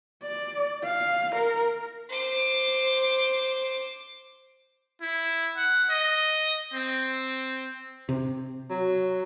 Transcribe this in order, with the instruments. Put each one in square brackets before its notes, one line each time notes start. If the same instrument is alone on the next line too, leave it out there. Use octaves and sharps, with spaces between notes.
[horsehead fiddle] D5
F5
A#4
[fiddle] C5 D6
[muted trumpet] E4
F#5
D#5
C4
[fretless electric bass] C3
[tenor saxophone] F#3